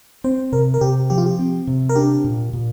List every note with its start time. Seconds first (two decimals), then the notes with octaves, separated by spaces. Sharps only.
0.24 C4 C5
0.52 C3 A#4
0.74 A#4
0.81 C3 G4
1.10 F3 G4
1.18 F4
1.26 G4
1.39 C4
1.67 C3
1.89 A#4
1.95 D4 G4
2.24 A#2
2.53 A#2